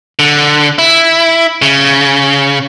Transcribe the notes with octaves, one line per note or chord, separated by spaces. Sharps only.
D3
E4
C#3